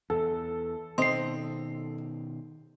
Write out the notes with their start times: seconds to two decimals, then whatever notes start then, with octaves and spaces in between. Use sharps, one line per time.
0.10 E2 A4
0.98 B2 D#3 C4 D#5 C6 C7